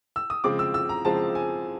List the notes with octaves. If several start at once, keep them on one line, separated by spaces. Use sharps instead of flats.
E6
D#6
C#3 F3 G#3 C4 D6
E6
E6
A#5
C#3 F3 G#3 C4 A5
G#5